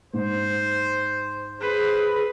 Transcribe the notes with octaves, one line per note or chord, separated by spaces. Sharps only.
G#2 C5
G#4 B4 C5